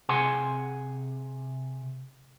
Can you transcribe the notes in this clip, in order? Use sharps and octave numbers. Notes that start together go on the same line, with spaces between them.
C3 G#4 F#5 G#5 C6